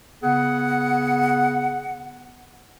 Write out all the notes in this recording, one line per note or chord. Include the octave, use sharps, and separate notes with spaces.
C#3 B3 G#4 F#5